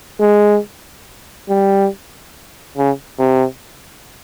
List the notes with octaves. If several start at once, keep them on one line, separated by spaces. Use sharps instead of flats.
G#3
G3
C#3
C3